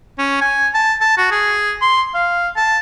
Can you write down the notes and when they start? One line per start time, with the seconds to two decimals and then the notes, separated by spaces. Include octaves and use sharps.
0.18 C#4
0.41 G#5
0.74 A5
1.01 A5
1.18 F#4
1.31 G#4
1.82 C6
2.14 F5
2.56 A5